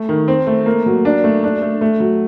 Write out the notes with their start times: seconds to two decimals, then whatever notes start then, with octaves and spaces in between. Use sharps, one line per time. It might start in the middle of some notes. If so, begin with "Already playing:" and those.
Already playing: A3
0.09 D#3
0.28 C4
0.47 A3
0.66 A#3
0.86 F#3
1.05 D4
1.24 A3
1.44 D4
1.62 A3
1.81 A3
2.00 F#3